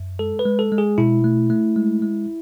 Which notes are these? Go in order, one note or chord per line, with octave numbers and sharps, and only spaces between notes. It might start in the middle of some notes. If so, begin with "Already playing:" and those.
Already playing: F#2
G#3 A4
B4
G#3
A4
G#3
G#4
B2 E4
A3
A3
G#3
G#3